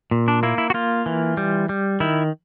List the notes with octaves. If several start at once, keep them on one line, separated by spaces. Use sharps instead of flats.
A#2
D4
A#3 E4
E4
F#4
A#3 F4
E3
G3
G3
D#3 E4